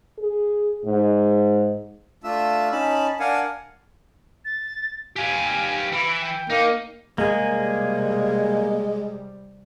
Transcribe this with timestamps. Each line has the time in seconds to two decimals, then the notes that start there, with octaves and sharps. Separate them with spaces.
0.18 G#4
0.85 G#2
2.24 A3 D4 F4 E5 E6
2.72 C#4 D#4 A5 B5
3.20 D4 A#4 F5 F#5 G#5
4.45 A6
5.16 G4 F5 G#5
5.92 E3 B5
6.21 G5
6.50 A#3 D#4
7.18 C3 G3 G#3 A#3 G#4